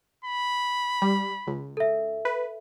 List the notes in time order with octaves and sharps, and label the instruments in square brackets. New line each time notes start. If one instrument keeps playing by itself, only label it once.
[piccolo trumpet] B5
[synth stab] G3
C#2
[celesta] A4 E5
[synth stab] B4